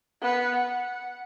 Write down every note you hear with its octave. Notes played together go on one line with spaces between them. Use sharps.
B3 B4
F#5